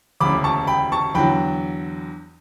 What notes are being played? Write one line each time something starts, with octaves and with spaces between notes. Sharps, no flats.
E1 D2 C#3 B5 D6
A5 C#6
G5 B5
A5 C#6
E2 D3 F#3 G5 B5